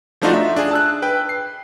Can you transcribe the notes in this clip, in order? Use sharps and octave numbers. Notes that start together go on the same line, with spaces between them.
F3 A3 D4 D#4 F4 F#4
E5
D4 G#4
A5 E6 F#6
B4 G5
C7